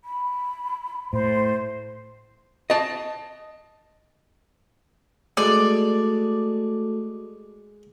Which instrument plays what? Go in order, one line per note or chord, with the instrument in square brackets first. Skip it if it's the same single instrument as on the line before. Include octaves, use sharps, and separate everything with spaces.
[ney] B5
[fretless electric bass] A2 [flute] C5 [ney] C6
[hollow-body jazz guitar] D#5 A5
[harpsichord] G#3 [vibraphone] A3 F#4 A4 [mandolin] D5